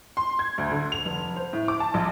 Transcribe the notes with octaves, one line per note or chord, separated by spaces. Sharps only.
C6
G#6
D2
D3
F7
F1
C5
A2
D6
A5
A#1